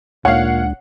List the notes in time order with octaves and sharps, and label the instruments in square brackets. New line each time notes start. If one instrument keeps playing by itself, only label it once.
[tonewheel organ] D2 G#3 D4 [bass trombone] A#2 [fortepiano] C#5 F5 [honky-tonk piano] F#5